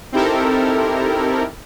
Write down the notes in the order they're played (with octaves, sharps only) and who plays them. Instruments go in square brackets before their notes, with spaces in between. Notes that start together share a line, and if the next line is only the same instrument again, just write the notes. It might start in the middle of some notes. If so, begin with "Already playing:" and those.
[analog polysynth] C4 D#4 E4 G4 A4 A#4